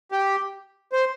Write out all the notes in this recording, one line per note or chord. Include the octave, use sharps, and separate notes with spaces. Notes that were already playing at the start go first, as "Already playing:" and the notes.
G4
C5